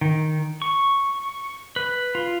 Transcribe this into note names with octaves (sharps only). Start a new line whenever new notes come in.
D#3
C#6
B4
F4